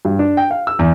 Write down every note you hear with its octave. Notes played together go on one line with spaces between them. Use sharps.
G2
D4
G5
F5
E6
E2